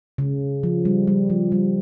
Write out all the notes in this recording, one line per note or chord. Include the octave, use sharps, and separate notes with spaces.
C#3
F3
G3
G3
F3
G3